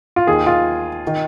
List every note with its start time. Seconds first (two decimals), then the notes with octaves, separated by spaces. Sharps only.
0.16 F4
0.27 D#2 D#3 G#4
0.46 F4
1.07 D#3